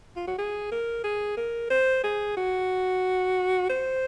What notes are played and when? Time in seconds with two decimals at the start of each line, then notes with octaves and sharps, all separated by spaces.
0.16 F4
0.27 F#4
0.38 G#4
0.72 A#4
1.04 G#4
1.37 A#4
1.70 C5
2.04 G#4
2.37 F#4
3.70 C5